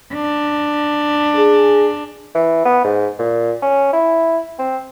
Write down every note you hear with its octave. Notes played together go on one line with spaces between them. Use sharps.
D4
G#4
E3
B3
G#2
A#2
C#4
E4
C4